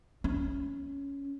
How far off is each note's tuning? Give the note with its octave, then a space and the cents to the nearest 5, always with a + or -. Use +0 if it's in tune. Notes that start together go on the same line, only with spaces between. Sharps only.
C#4 +5